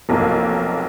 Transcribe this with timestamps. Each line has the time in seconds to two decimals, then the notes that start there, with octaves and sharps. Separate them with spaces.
0.09 F1 B1 F2 A#3